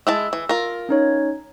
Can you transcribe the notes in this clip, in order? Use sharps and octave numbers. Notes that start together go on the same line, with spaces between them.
G#3 E4 A5 E6
E3
F4 A#4
C#4 D#4 C#5